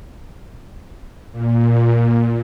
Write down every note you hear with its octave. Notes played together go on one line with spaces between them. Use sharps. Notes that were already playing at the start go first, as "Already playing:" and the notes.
A#2